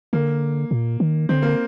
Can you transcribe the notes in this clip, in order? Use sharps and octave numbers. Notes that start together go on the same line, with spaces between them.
D3 A#3
A#2
D#3
D3 C4
A#3